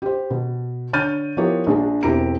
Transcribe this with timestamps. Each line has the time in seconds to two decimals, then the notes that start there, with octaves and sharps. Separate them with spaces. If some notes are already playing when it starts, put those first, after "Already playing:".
0.02 G4 C5
0.30 B2
0.93 D3 C#5 F6 G6 A6 D#7
1.37 F3 B3 E4 G4 A#4 C#5
1.67 A#1 G#3 D4
2.03 E1 C4 E4 G4 A#5 D7